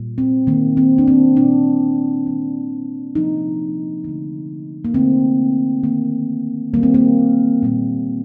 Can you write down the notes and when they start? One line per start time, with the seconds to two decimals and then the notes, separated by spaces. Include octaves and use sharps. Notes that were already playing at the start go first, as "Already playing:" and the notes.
Already playing: A#2 G3
0.18 C4
0.47 D#3 A#3
0.77 C4
0.98 D4
1.08 C4
1.37 A#2 G3 A#3 D4
2.26 D#3 G3 A#3
3.15 C3 F3 A#3 D#4
4.04 D3 A3
4.84 A#3
4.94 D3 A3 C4
5.84 D#3 A#3
6.74 D#3 G3 A#3
6.83 C4
6.94 A#3
7.63 A#2 G3 A#3